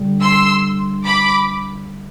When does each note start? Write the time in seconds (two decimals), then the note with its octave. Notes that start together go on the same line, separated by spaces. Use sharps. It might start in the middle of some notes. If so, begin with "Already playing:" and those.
Already playing: D3 G3 D4
0.22 C6 E6
1.05 B5 D6